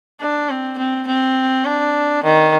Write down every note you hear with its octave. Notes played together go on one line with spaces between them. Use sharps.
D4
C4
C4
C4
D4
D#3